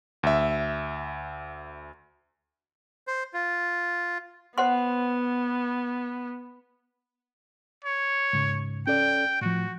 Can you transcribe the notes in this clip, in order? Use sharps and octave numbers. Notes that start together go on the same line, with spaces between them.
D2 E5
C5
F4
B3 C5 F#5 C6
C#5
G#2 C#3
C#4 A4 D5 G5
A2 F3 F#4